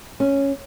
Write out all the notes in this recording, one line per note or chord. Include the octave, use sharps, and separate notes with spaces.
C#4